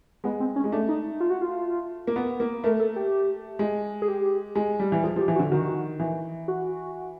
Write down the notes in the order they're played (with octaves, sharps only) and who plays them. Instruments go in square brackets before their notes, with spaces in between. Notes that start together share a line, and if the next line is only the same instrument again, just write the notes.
[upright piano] G#3 [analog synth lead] B3
[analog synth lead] C4
C#4
[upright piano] G#3
[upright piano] A3 [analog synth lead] D4
[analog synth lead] D#4
F4
F#4
F4
[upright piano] A#3
B3
A#3
[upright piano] A3 [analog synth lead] A#4
[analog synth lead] A4
G4
[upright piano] G#3
[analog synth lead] G#4
G4
[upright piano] G#3
G3
E3
[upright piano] F3 [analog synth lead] G#4
[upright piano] F3 [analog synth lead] G4
[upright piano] E3
[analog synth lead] F#4
[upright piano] D3
[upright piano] D#3 [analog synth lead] F#4
[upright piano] E3
[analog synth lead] F#4